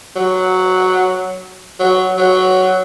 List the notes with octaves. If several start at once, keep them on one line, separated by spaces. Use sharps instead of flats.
F#3
F#3
F#3